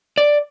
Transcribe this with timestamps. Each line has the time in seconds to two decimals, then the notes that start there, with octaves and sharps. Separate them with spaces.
0.18 D5